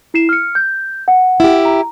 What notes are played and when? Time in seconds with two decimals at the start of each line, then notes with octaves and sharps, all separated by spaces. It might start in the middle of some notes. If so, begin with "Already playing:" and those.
0.14 E4 C7 E7
0.29 F6 C#7
0.55 G6
1.08 F#5
1.40 E4 G4
1.65 A#5